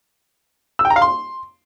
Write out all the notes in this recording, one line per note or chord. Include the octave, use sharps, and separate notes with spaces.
E6
G5
A#5
F5
C6